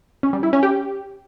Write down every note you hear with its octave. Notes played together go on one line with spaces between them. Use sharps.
C#4
G3
E4
C#4
G4